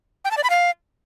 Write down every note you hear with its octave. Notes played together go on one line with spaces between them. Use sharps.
G5
A5
D5
B5
F5